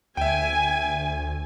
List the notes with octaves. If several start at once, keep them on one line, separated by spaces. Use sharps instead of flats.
D2 E5 G5 G#5